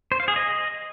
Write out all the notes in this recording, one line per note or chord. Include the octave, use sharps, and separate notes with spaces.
C5
F5
G#4
D#5